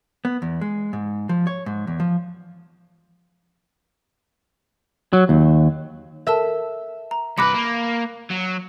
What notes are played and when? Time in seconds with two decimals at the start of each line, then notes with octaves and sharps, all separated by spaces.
0.25 B3
0.42 E2
0.61 G#3
0.93 G#2
1.29 F3
1.47 C#5
1.66 G#2
1.87 E2
2.00 F3
5.13 F#3
5.29 D#2
6.27 A4 A#4 E5 A5
7.11 A#5
7.38 C2 B4 B5 D6 F#6 A#6 C#7
7.54 A#3
8.31 F#3